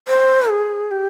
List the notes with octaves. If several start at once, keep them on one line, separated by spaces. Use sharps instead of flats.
C5
G#4
G4